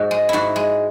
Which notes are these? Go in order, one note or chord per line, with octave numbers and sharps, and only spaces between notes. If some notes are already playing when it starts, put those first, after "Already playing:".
Already playing: G#2 F#4
G#3
G#2 E4 F#4
G#3